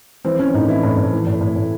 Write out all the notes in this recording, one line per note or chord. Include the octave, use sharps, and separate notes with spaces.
E3 C4
E3 C#4
A2 D#4
E3 E4
A2
A2
E3
A2
A2
A2